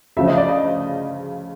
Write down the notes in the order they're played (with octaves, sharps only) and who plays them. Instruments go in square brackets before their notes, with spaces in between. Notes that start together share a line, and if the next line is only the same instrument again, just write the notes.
[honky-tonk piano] D2 C#3 F3 [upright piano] E5
[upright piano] D#5
D5
D#5